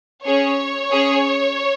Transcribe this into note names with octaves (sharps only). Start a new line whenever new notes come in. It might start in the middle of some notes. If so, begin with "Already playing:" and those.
C#4 G#4 C#5
C#4 G#4